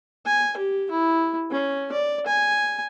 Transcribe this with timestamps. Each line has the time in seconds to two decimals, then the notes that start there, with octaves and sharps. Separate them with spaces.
0.26 G#5
0.57 G4
0.91 E4
1.51 C#4
1.93 D5
2.27 G#5